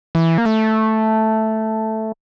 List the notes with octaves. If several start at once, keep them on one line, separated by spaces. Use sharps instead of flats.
E3
A#3
A3